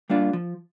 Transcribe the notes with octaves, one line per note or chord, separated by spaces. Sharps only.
G3 A#3 D4 F4
F3